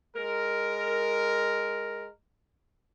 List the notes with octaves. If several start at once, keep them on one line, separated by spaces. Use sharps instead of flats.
G#3 A#4